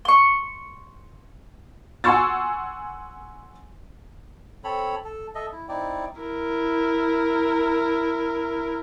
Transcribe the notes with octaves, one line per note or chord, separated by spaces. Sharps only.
C6 C#6
F#5 G#5 C6 C#6 E6 A6
C4 A4 C#5 B5
A4
A4 D#5 E5
E4
C4 D#4 E4 D5
E4 A#4